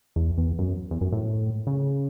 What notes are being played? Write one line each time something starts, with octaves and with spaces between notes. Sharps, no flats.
E2
E2
F#2
E2
F#2
A2
C#3